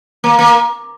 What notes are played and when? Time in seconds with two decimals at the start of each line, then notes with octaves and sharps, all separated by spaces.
0.24 A#3
0.39 A#3